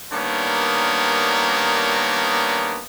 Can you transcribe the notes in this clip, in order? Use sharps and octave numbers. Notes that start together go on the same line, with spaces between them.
D#3 G3 A#3 B3 D4 C#5